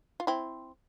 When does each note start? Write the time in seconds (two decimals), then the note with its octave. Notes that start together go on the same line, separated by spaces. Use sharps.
0.20 F4
0.27 C4 E4